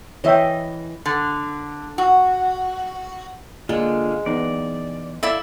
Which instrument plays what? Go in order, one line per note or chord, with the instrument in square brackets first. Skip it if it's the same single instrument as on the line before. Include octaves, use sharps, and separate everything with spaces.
[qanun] E3 D#5 [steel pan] C#5 E5 G5
[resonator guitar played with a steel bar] D3
F#4
[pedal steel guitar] D3 F4 [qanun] G#3 [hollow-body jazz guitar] A#3 D5
[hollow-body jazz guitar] E3 B3 D#4 [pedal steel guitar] D5
[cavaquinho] E4 D5 E5 [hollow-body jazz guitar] A4 F5